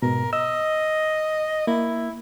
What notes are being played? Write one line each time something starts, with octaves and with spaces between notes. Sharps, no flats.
G#2 B2 A#4
D#5 E6
A#3 E4